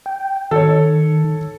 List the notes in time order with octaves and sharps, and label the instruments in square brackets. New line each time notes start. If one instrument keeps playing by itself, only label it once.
[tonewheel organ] G5
[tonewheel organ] D#3 [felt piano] A4 C#5